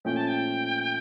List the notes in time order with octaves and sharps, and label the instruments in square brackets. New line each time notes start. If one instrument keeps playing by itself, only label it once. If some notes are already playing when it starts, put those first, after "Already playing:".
[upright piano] A#2 F3 A3 C#4 [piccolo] G5
[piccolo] A5
G5